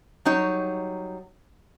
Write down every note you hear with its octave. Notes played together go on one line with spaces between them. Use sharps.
F#3 G3 D#4 C#5